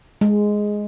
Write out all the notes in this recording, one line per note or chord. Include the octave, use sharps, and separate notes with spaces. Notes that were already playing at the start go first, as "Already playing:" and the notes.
G#3